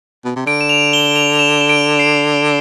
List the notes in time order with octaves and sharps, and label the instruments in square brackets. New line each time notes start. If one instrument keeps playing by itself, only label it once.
[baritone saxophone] B2
C3
[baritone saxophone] D3 [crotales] D7
[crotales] E7
F7
G7
F7
F7
E7
E7
D7
C7